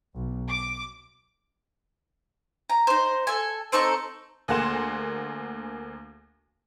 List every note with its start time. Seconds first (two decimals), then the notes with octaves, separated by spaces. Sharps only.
0.15 B1
0.48 D6
2.70 A#5
2.87 D#4 C5
3.27 A4 G#5
3.72 C4 D#4 A4 C#6
4.48 D2 A#3 G#4 F#5 C6 E7